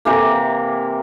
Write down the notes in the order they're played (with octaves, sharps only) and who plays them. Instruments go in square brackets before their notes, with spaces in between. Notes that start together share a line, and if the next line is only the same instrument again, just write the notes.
[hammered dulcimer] C3 E3 A#3